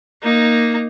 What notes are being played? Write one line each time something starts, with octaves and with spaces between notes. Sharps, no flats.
A#3 D#4